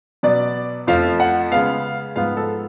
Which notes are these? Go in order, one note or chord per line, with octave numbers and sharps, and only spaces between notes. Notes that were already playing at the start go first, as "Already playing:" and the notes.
B2 F#3 B3 D5
F2 F3 A3 F5
F#5
C#3 G#3 B3 F5
G#2 F3 B3 F5
A4